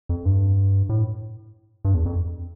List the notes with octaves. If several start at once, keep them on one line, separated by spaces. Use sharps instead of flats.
F2
G2
A2
G2
E2
F2